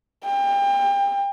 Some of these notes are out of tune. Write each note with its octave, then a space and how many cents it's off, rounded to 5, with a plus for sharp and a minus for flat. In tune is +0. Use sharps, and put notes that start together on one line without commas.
G5 +30